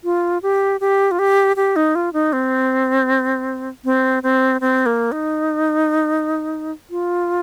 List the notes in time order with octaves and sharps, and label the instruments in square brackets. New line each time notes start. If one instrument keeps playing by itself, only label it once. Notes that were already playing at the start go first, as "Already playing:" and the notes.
[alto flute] F4
G4
G4
F4
G4
G4
D#4
F4
D#4
C4
C4
C4
C4
A#3
D#4
F4